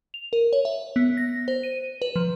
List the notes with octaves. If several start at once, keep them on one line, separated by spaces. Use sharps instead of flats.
F7
A#4
C#5
E5
B3
A#6
C5
D#7
B4
F3